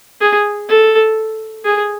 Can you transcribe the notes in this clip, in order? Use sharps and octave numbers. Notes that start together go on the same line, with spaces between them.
G#4
A4
G#4